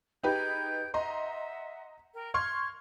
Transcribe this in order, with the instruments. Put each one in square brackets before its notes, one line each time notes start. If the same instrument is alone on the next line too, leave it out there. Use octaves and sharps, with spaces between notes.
[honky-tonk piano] D#4 G4 B4 [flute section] G#4 G5 G6
[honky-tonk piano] D#5 A#5 C6 [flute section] E5 F#5
[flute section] A#4 G5
[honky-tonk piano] C6 C#6 F6 [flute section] G#6